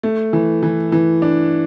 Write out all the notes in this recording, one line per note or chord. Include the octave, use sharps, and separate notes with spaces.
A3
E3
E3
E3
D4